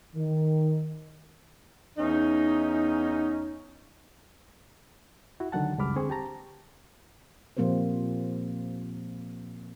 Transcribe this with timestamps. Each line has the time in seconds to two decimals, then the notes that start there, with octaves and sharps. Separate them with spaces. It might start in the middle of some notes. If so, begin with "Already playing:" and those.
0.16 D#3
1.98 E2 C#4 D#4
5.40 E4 F#4
5.52 C#2 D3 D#3 F#3 F#5 A5
5.79 C#2 F#2 G3 B5 D6 F6
5.96 D3 C4 G#4 C5 C#6
6.10 G4 A5 A#5
7.57 A#2 F3 A#3 C4 G4 C5